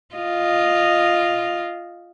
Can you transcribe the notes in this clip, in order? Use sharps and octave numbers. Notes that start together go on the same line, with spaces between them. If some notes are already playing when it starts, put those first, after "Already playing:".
F4 D#5